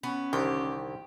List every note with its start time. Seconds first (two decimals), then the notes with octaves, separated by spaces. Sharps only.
0.03 B3 C#4
0.33 C2 D3 D#3 G4